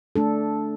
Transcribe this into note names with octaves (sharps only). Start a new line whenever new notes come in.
A3 D4 A4